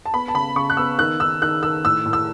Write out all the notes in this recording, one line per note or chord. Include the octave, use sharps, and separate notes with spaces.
A5
B3 B5
A5
C#3 B5
C#3 C#6
F#6
B3 E6
D#3 F#6
D#3 E6
D#3 F#6
D#3 E6
A2 E6
A2
E6